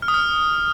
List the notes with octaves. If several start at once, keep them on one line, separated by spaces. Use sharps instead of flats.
F6
D#6
F6